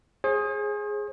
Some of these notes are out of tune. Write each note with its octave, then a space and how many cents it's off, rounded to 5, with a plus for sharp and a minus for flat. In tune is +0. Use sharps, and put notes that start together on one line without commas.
G#4 +0 C5 +45